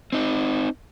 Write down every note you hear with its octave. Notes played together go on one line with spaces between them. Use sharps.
C4 D#4